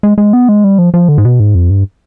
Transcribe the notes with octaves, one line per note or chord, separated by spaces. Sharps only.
G#3
G#3
B3
G#3
G3
F3
F3
D3
G#2
B2
G#2
F2
G2